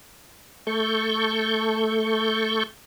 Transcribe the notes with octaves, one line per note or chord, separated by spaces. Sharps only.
A3 A4 C#6 G6